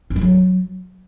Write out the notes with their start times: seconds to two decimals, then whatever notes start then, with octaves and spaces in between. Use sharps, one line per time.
0.10 C4
0.16 G#3
0.21 F#3